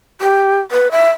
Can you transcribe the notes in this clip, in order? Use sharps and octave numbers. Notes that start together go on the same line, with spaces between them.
G4
B4
E5